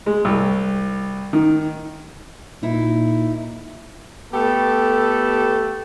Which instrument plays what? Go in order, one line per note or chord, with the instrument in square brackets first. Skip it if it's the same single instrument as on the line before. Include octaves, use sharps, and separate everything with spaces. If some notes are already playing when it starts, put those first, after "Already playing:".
[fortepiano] G#3
C2
D#3
[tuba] A#2 [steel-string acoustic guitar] D#4 E4
[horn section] A3 B3 G4 A4